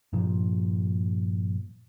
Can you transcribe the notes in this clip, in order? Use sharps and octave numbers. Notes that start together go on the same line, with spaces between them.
G2 A#2 F3